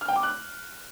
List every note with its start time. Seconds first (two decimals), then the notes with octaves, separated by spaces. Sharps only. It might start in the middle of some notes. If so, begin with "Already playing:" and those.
0.01 F6
0.08 G5
0.16 D6
0.23 F#6